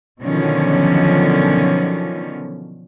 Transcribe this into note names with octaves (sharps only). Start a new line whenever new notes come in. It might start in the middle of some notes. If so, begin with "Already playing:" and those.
B2 D3 D#3 F3 F#3 C#4